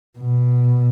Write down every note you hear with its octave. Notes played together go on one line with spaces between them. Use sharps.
B2